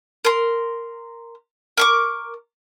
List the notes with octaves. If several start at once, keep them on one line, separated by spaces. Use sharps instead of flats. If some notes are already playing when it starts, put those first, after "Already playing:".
A#4 C6
A#4 C#6 D6